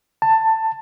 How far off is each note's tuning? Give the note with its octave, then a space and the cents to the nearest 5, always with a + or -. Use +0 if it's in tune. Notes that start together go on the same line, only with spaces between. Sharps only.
A5 +15